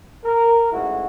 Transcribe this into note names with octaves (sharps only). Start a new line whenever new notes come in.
A#4
A1 G#2 E4 F#4